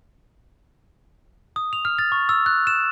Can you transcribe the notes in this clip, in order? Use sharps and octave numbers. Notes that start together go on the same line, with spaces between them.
D#6
F7
F6
A6
C#6
E6
F#6
E7